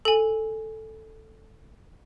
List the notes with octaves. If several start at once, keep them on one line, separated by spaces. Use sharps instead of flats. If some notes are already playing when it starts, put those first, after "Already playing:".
A4 G#5